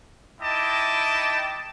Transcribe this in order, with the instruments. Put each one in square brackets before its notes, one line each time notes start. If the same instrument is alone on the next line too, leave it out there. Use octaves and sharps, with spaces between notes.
[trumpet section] D#4 E4 D#5 G5 A5 D6